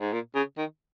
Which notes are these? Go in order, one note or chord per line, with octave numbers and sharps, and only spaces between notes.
G#2
A#2
C#3
D#3